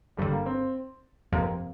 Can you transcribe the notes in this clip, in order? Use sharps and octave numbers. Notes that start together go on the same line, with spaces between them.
G1 G2 D3 G3
A#3
C4
G1 F2 C3 A#3